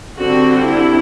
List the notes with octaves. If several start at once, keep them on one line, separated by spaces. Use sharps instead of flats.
D3 G3 C4 F#4
E4